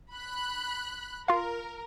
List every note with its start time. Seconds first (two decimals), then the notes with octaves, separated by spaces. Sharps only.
0.12 B5 F#6
1.28 F4 A#4 F5